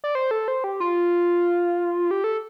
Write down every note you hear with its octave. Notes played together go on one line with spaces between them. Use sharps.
D5
C5
A4
C5
G4
F4
G4
A4